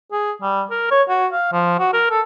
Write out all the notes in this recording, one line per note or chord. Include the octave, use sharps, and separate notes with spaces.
G#4
G3
A#4
C#5
F#4
F5
F3
F#4
A#4
A4